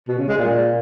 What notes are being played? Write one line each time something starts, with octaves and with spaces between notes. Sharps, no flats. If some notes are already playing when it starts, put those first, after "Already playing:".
B2
C#3
G#3
A#2